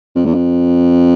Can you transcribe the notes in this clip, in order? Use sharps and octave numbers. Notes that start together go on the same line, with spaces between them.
F2
E2
F2